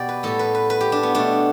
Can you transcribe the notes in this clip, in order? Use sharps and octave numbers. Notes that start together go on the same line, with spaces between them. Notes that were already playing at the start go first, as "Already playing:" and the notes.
Already playing: B2 B3 G4 D5
B4
A2 G3 B3 A4
B4
B4
B4
G4
D4
B3
B2 A3 D4